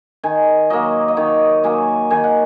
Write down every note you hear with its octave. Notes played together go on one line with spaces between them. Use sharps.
D#3 G#5
F#3 A#3 D#5
D#5
D#3 C#5
F#3 A#3 G#5
D#3 G#5
F#5